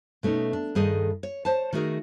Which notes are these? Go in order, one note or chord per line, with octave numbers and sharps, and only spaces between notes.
B2 A3 C#4 D#4
D4
G2 D#3 G#4 A4 D#5
C#5
C5 C#5 A5
D#3 A3 F#4 G#4 A#4